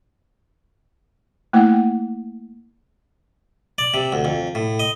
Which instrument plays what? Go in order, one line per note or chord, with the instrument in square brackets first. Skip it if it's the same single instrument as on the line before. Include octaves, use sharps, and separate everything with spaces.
[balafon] A3 A#3 E4 F#5 G5
[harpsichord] D5
C3
D2
F2
A2
D#5